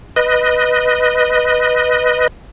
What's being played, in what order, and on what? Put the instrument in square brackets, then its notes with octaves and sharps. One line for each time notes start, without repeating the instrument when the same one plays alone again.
[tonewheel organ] B4 D#5